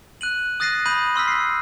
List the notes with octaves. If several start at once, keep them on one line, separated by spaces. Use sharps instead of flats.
F#6 D#7 F#7
D#6 F#6 A6 A#6 C7 D#7
B5 D#6 G6 D#7 F#7
C6 E6 F6 B6
B6 C7